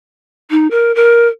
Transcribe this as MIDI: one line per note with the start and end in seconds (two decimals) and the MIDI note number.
0.51 0.67 63
0.71 0.94 70
0.95 1.28 70